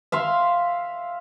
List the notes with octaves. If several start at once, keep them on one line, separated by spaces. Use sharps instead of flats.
E5 F5 C6